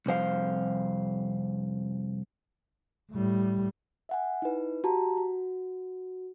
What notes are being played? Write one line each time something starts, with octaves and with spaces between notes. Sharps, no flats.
C2 F2 C5 F5
A2 G3
E5 F#5 G#5
D#4 E4 B4
F#4 G4 A5 A#5
F#4